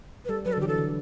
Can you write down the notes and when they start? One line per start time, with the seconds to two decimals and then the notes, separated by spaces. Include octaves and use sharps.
0.25 B4
0.29 G3 A4
0.45 F#3 B4
0.53 A4
0.57 D3
0.61 E3 G4
0.68 A4
0.78 D3